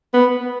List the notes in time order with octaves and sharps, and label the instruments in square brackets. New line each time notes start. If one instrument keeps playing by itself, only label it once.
[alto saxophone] B3